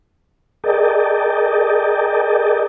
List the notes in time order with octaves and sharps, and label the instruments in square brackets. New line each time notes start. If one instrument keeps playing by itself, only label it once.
[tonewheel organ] G#4 A#4 D5 D#5 G5 A5